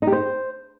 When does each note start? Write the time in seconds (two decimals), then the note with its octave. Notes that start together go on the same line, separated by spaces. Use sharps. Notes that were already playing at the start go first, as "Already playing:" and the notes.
0.02 D#4
0.07 G4
0.12 C5